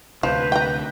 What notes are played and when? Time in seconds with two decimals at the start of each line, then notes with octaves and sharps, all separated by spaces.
0.23 D2 C3 F3 B4 G6
0.52 G5 A#5